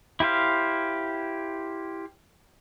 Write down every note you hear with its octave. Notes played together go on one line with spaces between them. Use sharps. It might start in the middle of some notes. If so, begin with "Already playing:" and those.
E4 G4 C5 F5